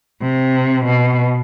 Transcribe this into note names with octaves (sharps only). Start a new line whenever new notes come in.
C3
B2